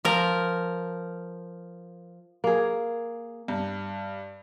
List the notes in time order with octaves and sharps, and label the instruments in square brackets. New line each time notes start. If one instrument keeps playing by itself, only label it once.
[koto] F3 A#4
[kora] A#3 G#4
[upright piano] G2